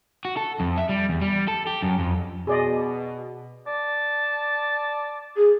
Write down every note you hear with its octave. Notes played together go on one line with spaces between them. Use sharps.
F#4
A4
F2
E5
G3
E2
G3
A4
G4
F#2
F2
B2 G#4 D5 D#5
D5 A5
G#4